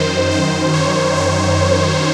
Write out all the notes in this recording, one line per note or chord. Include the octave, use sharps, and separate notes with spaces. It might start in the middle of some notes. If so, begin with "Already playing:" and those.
Already playing: F#2 D#3 C5
C5
C#5
C5